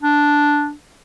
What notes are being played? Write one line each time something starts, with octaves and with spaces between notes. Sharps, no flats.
D4